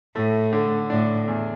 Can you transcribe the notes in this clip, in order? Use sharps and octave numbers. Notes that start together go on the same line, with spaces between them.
A2 A3
D3
A2 D4
E2